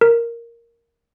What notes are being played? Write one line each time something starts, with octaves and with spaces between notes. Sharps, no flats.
A#4